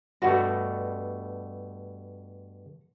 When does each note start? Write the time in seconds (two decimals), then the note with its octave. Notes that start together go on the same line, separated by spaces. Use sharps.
0.22 G2 B2 A3 F#4